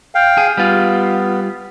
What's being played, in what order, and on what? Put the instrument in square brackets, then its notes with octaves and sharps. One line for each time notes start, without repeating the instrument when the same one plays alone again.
[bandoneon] F5 G5
[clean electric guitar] G#4
[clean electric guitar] G3 F4 [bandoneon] B3